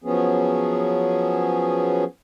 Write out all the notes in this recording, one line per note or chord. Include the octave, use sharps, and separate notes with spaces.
F3 F#3 B3 C#4 G#4